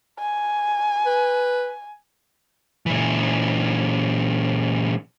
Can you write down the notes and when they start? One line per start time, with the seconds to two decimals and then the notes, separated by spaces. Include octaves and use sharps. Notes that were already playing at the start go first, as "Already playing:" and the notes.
0.19 G#5
1.06 B4
2.86 A#2 E3